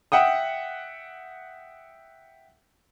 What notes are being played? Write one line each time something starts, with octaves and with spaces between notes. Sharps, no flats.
E5 F#5 G5 D#6